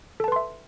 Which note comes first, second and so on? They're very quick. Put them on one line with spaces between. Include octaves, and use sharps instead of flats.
A4 A5 B4 C6 E5